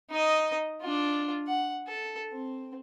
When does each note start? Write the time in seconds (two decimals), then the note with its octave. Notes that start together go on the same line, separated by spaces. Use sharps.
0.10 D#4 D#5
0.82 D4 F4
1.48 F#5
1.87 A4
2.32 C4